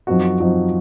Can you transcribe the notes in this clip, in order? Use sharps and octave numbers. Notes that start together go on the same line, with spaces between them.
F#2 F3 C4 D#4 F#4
F#2 F3 C4 D#4 F#4